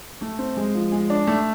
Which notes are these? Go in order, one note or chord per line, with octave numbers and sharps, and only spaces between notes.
A3
C4
G#3
F3
G#3
D4
A3